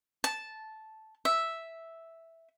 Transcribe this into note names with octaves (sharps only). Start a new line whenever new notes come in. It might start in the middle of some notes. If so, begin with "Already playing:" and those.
A5
E5